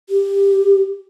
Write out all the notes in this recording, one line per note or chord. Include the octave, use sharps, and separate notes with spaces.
G4